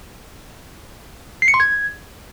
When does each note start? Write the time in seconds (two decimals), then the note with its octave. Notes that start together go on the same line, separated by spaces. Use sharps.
1.42 C7
1.48 C#7
1.54 C6
1.60 G#6